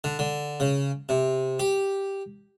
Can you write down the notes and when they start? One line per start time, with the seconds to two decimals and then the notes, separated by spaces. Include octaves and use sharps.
0.04 D3
0.19 D3
0.60 C#3
1.09 C3
1.60 G4